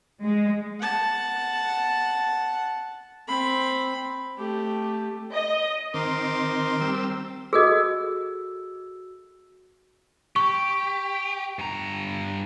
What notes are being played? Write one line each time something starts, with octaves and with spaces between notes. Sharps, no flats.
G#3
F#5 A5
C4 B5
A3 G4
D#5
D#3 C4 A#4 C6 D6
G3 C4 E6
F#4 G#4 A4 D#5 E6
G4 C#6
G2 A#5